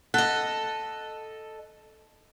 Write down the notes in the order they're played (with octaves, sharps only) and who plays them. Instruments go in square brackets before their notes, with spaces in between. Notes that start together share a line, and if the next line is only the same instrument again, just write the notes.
[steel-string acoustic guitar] A4 D#5 [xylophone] F#5 F#6